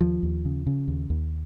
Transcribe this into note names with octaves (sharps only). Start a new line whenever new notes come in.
D#2 F3
D#2
C#3
C#3
D#2
D#2